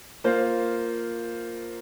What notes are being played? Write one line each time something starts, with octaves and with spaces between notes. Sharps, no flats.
A#3 F4 C5